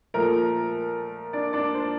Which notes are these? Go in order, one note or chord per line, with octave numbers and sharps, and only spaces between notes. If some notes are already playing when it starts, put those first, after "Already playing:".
A#2 F3 A3 A#4 A#5
D4 D5
D4 D5
C5